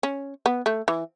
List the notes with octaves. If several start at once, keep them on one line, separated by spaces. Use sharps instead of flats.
C#4
B3
A3
E3